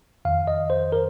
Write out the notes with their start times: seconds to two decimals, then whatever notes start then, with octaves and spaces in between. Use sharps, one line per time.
0.25 F2 D#3 F5
0.47 D#5
0.70 C5
0.92 A#4